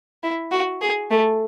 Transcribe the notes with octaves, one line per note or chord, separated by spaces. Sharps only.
E4
F#4
G#4
A3